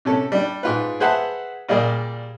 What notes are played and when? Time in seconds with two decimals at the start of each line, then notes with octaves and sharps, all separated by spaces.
0.05 C3 C#4 A4
0.32 G3 D4
0.63 G#2 F4 B4
1.00 G#4 B4 C5 E5 F#5 A5
1.69 A#2 G3 A#3 G#4 D5